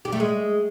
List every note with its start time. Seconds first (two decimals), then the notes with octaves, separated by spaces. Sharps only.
0.05 G4
0.12 A3
0.20 G#3